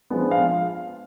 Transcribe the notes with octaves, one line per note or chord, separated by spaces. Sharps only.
F3 G#3 B3 D4
F5